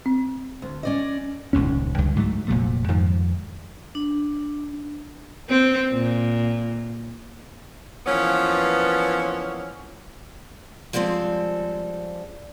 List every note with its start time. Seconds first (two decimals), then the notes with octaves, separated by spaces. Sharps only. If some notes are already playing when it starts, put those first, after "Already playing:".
0.06 C4
0.62 D2
0.83 C#4 D5 D#5
1.53 D#1 C#2 G#2 C#4
1.98 C#2 G2 D3 G3
2.16 G#2 F#3 A3
2.48 F1 A#2 F#3 A3
2.88 F2 G#2 D#3 F3
3.95 D4
5.49 C4
5.93 A#2
8.06 E3 F3 A#3 B3 C#4
10.93 F3 G3 G#3 C4 A4